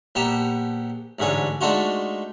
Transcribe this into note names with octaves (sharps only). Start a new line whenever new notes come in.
A#1 B3 G4 A5 A#5
A1 G#2 D3 G#4 C#5
G#3 A3 D4 D#4 F4 F#4